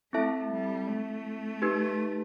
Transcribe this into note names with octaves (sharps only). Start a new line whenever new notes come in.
A3 C4 E4 A4 E5 A5
G3
A3
D#4 G4 B4